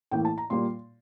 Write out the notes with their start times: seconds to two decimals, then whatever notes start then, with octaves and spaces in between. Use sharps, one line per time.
0.11 A2 E3 A#3 G5
0.25 A5
0.38 A#5
0.50 A#2 G3 A#3 C6